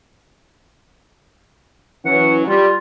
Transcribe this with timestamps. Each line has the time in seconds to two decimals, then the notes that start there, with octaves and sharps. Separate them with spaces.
2.05 E3 F#3 C#4 F#5
2.48 G3 F4